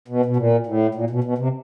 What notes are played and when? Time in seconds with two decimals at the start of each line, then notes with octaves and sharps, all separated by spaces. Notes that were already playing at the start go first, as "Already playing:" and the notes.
0.08 B2
0.26 B2
0.36 A#2
0.67 A2
0.95 A#2
1.10 B2
1.24 B2
1.38 C3